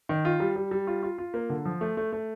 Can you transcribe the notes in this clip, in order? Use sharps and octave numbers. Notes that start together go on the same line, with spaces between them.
D#3
F4
G3
G3
G3
F4
F4
F4
A#3
D3
F3
A3
A3
A3